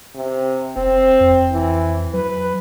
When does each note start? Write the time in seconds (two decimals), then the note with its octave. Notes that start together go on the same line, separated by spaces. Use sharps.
0.16 C3
0.76 F1 C4
1.20 F2
1.52 E3
2.14 F#3 B4